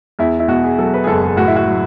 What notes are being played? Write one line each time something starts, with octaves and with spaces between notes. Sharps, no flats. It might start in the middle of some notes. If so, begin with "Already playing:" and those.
E2 E4
E4
B2 F#4
G#4
F#3 A4
B4
G#4
F#1 A4
G#4
A2 F#4
E4
F#4
F#3